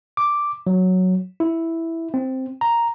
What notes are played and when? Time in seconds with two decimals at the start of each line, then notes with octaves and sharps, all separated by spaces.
0.17 D6
0.67 F#3
1.40 E4
2.14 C4
2.61 A#5